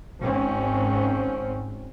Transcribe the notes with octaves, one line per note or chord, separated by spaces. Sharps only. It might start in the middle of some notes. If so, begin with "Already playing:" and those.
G#1 G#2 C4 C#4